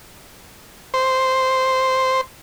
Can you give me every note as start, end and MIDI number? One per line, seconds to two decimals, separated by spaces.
0.94 2.21 72